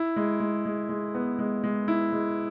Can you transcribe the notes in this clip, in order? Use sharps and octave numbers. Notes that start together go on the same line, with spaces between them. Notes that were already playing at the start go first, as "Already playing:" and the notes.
Already playing: E4
G#3
G#3
G#3
G#3
B3
G#3
G#3
E4
G#3